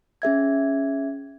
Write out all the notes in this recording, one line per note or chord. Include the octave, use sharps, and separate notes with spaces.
C#4 G#4 E5 G#6